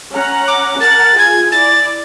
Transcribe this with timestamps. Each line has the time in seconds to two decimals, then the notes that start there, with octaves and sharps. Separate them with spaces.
0.14 C#4 F#5 A#5
0.48 D6
0.81 A#4 F#5 A5 A6
1.18 F4 G#4 G#5 G#6
1.52 E4 D5 A6